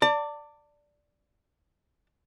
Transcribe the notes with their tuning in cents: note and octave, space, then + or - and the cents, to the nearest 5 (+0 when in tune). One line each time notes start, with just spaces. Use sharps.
D5 +0 A5 +35